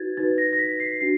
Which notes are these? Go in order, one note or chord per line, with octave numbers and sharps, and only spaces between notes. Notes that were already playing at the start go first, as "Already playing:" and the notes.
Already playing: D#4 F#4 B4 G#6 A6
D#4 F#4 B4 A6
A#6
A#6
B6
C7
D4 F#4 C7